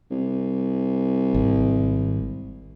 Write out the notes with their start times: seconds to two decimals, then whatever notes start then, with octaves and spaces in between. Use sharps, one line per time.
0.10 C2
1.34 G#1